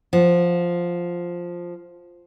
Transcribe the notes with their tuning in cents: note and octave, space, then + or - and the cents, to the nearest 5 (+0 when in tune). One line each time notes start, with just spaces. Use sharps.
F3 +0 F#5 -15